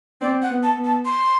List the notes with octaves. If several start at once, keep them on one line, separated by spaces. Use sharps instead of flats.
C4 D5
F#5
B3
A5
B3
A5
C6